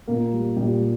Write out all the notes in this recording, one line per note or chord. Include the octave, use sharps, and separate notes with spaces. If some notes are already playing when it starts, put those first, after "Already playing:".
A#2 A#3 A#4
G3
A#2 G3 G4
G3